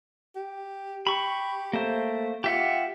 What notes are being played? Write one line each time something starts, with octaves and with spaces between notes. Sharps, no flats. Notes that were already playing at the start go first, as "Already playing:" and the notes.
G4
G4 B5 C#6
A3 A#3 C5
F4 G4 E5 F#5